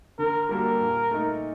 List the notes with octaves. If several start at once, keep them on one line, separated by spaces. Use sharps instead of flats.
D3 A#4
G3 A#3 F#4 A4 A#4
A#2
A3 D#4